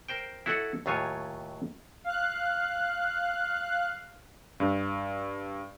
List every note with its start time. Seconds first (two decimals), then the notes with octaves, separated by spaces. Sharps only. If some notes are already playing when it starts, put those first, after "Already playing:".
0.08 A#4 C5 G5
0.46 E4 F#4 A4 C#5 D#5 F#5
0.86 D#2 A2 F#3 F4 C#5 G#5
2.04 F5 F#6
4.60 G2